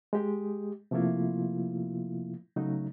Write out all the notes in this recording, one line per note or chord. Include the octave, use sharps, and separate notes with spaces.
G#3 G4 G#4
C3 F3 A3 A#3 E4 F4
C#3 F#3 A3 D#4